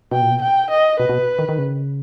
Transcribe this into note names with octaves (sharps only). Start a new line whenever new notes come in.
B2 G5
A#2
B2
G5
D#5
B2 B4
B2
D#3
D#3
C#3